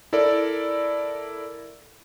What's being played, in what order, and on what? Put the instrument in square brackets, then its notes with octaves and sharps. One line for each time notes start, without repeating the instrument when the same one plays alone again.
[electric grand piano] E4 A4 A#4 D5